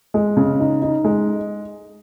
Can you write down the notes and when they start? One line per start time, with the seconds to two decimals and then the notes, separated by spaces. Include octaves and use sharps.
0.14 G#3
0.37 C#3
0.59 D#4
0.82 D#4
1.04 G#3